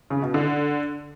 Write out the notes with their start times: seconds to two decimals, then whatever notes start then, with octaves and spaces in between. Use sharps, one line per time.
0.10 C#3
0.22 B2
0.34 D3